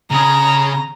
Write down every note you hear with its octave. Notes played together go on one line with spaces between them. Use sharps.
C#3 G#4 A#5